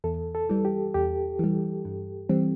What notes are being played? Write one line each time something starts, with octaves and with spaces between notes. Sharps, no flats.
E2 A4
A4
E3 G3
G4
E2 G4
E3 G3
G2
E3 G3 C4